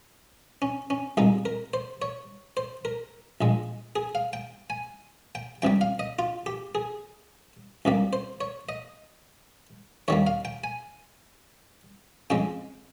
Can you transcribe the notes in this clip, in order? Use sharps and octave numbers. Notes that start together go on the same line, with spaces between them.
C#4
C#4
C2 A#2 G#3 D#4
A#4
C5
C#5
C5
A#4
A#1 A#2 G#3
G#4
F5
G5
G#5
G5
C#2 C3 G3 G5
F5
D#5
F4
G4
G#4
C#2 C3 G3 A#3
C5
C#5
D#5
D#2 D#3 G3 A#3 C#5
F5
G5
G#5
F2 C#3 G#3 G5